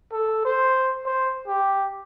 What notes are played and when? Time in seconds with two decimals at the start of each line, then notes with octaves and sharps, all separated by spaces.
0.12 A4
0.45 C5
1.05 C5
1.47 G4